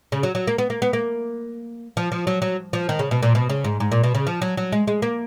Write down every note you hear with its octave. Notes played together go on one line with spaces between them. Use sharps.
C#3
F#3
F#3
A#3
B3
A#3
B3
A#3
F3
F3
F#3
F#3
F3
D#3
C#3
B2
A#2
B2
C#3
G#2
G#2
A#2
B2
C#3
F3
F#3
F#3
G#3
G#3
A#3